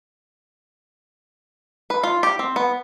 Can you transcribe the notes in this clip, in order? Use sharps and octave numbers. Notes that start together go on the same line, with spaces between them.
B4
F4
G4
C4
B3